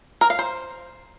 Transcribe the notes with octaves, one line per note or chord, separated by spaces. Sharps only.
A#4
F5
C5